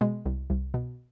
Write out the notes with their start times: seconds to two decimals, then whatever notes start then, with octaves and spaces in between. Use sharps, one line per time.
0.01 B2 G#3
0.26 C2
0.50 C2
0.74 B2